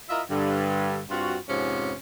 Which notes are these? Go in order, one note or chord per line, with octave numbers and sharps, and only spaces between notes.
E4 F4 A#4 D#5 E5
G2 D3
G2 C4 F4 F#4
F2 G#2 C3 F3 B3 C#4